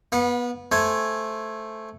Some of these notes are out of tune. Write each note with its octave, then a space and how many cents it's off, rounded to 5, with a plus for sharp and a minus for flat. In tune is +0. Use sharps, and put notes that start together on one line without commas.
B3 -20 F#5 -40
A3 +0 C5 +0 G#5 +0